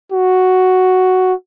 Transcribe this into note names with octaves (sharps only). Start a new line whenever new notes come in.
F#4